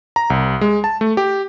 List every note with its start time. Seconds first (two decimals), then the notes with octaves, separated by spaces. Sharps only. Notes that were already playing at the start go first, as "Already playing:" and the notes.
0.16 A#5
0.30 C2
0.61 G#3
0.84 A5
1.01 A3
1.17 G4